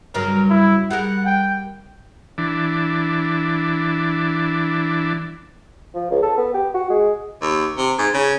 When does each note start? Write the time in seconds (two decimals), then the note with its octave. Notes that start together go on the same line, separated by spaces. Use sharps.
0.14 G2 C#3 F#3 A#4
0.49 E4
0.90 G3 G#4 A#4 F#5
1.26 G5
2.38 E3 D4
5.94 F3
6.11 C#2
6.23 A4
6.37 B3
6.54 G4
6.74 F#4
6.90 G#3
7.42 D#2
7.78 C3
7.98 G#2
8.14 C#3